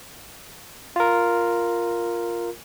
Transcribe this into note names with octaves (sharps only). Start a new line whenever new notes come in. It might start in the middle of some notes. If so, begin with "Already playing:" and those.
F4 A#4